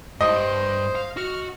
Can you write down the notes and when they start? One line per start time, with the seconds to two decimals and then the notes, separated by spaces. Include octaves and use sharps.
0.21 G2 C5 D#5
0.95 F5
1.17 F#4 F6